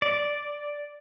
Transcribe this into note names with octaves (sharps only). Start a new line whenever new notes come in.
D5